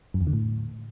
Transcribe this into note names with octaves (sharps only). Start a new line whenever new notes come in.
F#2
E2
D3
A2